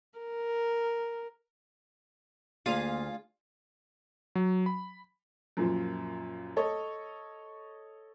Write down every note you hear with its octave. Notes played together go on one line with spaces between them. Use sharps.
A#4
D2 A#3 F4 G#4 F5
F#3
B5
F#2 A#2 F3
A4 C#5 D#5